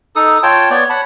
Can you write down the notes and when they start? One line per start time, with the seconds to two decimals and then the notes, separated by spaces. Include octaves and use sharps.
0.16 D#4 A4 D#6
0.43 F4 C#5 G5 A5
0.70 B3 C#5 D5
0.90 C#5 F#5 A5 B5